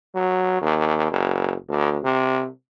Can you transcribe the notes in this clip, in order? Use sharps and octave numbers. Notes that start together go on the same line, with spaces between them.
F#3
D#2
F#1
D2
C3